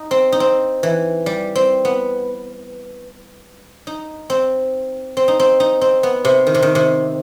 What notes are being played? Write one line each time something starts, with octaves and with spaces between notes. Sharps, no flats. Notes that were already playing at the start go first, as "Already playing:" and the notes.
Already playing: D#4
C4
D#4
C4
E3
G3
C4
B3
D#4
C4
C4
D#4
C4
D#4
C4
B3
C3
D#3
C3
D#3
C3